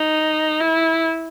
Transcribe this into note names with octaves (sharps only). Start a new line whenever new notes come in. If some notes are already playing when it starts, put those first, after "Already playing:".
Already playing: D#4
E4